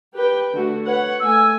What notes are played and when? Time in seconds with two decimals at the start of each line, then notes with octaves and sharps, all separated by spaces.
0.15 G4 B4 G5
0.54 D3 A3 F#4
0.86 B4 C#5 F#5
1.20 A3 G#5 E6